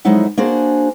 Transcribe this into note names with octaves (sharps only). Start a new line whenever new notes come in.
F2 F#3 G#3 D#4 E4 F#5
A#3 D4 F#4 G#4 C5